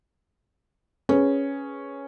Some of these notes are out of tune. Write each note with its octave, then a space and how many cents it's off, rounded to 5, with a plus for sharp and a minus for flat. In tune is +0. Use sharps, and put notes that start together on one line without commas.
C#4 +0 G#4 +0 B4 +0